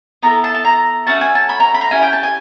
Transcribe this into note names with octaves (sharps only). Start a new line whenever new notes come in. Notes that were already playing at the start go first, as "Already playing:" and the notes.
B3 E4 A4 A#5
A5
A5
A#5
A3 C#4 F#4 A5
G#5
A5
B5
A#5
B5
A#5
C#4 E4 G4 G#5
G5
A5
G#5